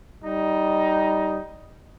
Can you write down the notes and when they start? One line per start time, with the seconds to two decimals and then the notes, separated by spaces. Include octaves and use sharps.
0.24 G3 D#4